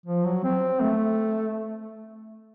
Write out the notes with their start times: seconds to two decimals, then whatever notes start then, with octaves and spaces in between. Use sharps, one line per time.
0.06 F3
0.25 F#3
0.43 C4
0.81 A3